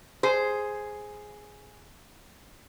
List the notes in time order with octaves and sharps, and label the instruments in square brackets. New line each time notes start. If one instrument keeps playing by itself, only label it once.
[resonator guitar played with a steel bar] G#4 C5